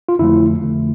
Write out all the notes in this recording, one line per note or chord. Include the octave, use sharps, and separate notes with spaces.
F4
F2 D3 F3 A3 E4
F2 D3 F3 A3